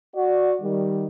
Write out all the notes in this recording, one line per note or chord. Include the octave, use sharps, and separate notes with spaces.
F#4 D5
D#3 G3